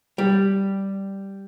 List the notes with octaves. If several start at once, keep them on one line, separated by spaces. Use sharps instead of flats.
G3